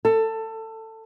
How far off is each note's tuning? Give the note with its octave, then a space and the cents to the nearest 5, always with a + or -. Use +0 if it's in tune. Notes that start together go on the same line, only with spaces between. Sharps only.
A4 +20